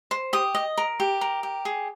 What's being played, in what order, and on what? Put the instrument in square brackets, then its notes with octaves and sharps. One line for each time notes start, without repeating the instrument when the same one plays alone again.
[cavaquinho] C5
G4 D#6
D#5
A#4
G4
A#4
G4
G#4